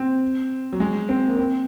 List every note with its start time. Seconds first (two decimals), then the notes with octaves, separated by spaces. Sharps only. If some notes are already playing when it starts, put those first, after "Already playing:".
Already playing: C4
0.73 F#3
0.80 G#3
1.09 C4
1.27 A#3
1.37 C4